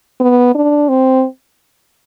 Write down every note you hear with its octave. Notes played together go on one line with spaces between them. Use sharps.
B3
D4
C4